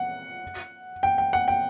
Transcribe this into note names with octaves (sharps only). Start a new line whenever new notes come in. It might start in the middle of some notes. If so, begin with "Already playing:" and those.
Already playing: F#5
G5
G5
F#5
G5